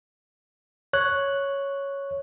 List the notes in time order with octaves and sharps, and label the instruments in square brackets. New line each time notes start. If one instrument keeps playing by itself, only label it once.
[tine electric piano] C#5 F#6